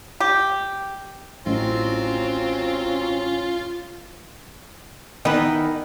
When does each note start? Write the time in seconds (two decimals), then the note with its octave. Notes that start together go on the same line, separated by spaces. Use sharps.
0.20 G4
1.46 A1 F#3 C4 C#4 F4
5.25 D#3 E3 B3 B4